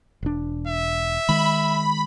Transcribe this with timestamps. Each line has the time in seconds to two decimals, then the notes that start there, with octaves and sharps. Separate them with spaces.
0.23 E1 D4
0.68 E5
1.29 D#3 G#3 B5